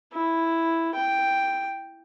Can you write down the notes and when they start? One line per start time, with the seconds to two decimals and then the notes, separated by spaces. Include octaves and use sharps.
0.13 E4
0.95 G5